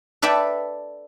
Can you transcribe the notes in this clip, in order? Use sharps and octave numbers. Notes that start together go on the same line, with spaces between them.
A4 B4 D5 E5 G5